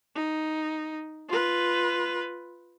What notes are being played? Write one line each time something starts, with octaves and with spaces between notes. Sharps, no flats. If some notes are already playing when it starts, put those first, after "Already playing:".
D#4
F4 B4